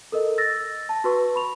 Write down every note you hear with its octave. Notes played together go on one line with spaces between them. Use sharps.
A4 A#4 D#5
E6 A6 A#6
A5
F#4 B4 C#6
B5 C#6 F7